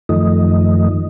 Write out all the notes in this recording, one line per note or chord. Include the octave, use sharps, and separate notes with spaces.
F#2 D#3 F3 A3 D#5